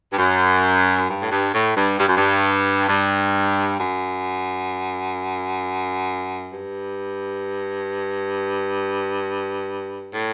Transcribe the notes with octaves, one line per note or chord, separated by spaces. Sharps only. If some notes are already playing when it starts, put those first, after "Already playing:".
G2
F#2
G2
A2
G2
A2
G2
G2
F#2
G2
G2
F#2
G2
A2